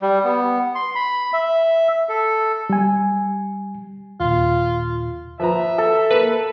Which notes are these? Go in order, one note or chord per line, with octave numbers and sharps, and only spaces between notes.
G3
B3
C6
B5
E5
A4
G3 G#5
D#2 A#2 F4
F3 B4 E5 A#5
A4
A#3 B4